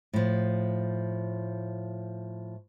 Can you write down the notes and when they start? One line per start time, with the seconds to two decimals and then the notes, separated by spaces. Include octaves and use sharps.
0.13 A2 F3